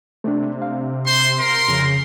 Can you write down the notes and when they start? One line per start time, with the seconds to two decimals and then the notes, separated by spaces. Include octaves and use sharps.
0.24 C3 A3 D4
0.62 F5
1.06 C5 C6
1.39 A#4 C6
1.68 F2 C#3